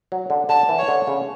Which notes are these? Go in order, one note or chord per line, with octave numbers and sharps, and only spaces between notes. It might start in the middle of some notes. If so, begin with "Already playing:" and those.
F#3
D3
D3 A5
E3
C#5
D3
C#3